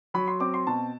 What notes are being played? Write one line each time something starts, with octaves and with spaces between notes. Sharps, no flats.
F#3 B5
C6
C4 D6
C6
B2 A5